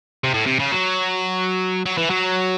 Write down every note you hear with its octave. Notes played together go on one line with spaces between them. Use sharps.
C3
A2
C3
C#3
F#3
F#3
E3
F#3